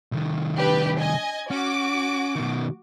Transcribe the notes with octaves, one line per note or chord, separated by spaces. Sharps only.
C2 D#3
D4 G4 B4
D#5 G#5 G#6
C#4 F#4 D6
B2 D#3